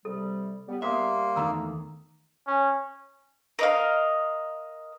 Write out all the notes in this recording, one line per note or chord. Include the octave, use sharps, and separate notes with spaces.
C3 G3 A4
G3 B3
G3 A#3 B3 C5 E5 F5 C6 D#6
E2 D#3 A3 A#5 D#6 E6
C#4
A#4 D#5 F5